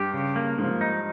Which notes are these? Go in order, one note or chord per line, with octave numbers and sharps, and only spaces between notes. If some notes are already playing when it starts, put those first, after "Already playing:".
Already playing: G2 G4
C#3
A#3
G#2 F3
D#4